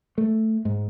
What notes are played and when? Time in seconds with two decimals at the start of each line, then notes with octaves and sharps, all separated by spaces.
0.18 A3
0.65 G#2